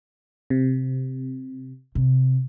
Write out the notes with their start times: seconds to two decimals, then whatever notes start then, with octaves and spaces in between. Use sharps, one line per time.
0.50 C3
1.95 C3